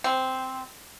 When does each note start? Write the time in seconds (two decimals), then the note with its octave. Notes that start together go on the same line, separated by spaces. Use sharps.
0.04 C4